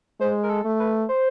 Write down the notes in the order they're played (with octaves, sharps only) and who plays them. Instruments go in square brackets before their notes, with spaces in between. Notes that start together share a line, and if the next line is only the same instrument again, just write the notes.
[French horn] G#3 [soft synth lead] C5
[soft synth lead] A#4
A4
[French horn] A3
[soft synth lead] B4
C5